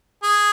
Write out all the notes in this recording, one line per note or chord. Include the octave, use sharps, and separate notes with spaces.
G#4